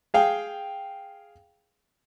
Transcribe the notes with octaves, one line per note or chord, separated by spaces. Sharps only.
G#4 F5 G5